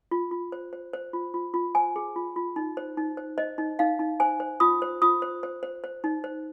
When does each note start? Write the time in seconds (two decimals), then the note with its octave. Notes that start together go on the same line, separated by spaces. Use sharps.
0.11 F4
0.31 F4
0.52 C5
0.73 C5
0.93 C5
1.13 F4
1.34 F4
1.54 F4
1.75 C5 G#5
1.96 G#4
2.16 F4
2.36 F4
2.56 D#4
2.77 C5
2.97 D#4
3.17 C5
3.38 C5 D#5
3.58 D#4
3.79 D#4 F5
3.99 D#4
4.20 C5 G#5
4.40 C5
4.60 F4 D#6
4.82 C5
5.02 F4 D#6
5.22 C5
5.43 C5
5.63 C5
5.84 C5
6.04 D#4
6.24 C5